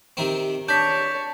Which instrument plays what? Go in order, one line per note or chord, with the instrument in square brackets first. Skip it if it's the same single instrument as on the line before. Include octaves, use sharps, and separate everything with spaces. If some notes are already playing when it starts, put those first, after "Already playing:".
[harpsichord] C3 D#3 C4
[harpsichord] D4 [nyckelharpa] C#5 A5 [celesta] G6 B6